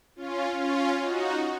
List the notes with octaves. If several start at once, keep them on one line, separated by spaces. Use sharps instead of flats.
C#4 F4
C#4 F4
D#4 F#4